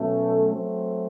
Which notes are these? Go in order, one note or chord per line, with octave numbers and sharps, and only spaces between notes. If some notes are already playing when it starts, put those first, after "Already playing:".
Already playing: B2 F#3 A3 C#4
F#3 A3 C4